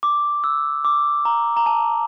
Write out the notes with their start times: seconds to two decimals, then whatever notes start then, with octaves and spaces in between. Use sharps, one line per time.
0.03 D6
0.44 E6
0.85 D6
1.25 A#5
1.57 A#5
1.66 A5